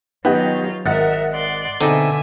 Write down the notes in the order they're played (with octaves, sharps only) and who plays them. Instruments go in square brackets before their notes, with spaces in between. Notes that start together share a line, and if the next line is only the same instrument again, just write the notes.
[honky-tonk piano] D#3 G4 D#5 [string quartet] F#3 F4 [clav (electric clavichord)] B3
[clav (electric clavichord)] G#1 [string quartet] A#4 E5 [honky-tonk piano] D#5 F#5 A6
[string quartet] D5 C6
[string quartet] B2 E5 G#5 [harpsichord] D3 [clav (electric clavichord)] C4 D#4 G#4